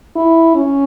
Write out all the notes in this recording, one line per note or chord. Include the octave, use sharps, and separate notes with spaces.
E4
C#4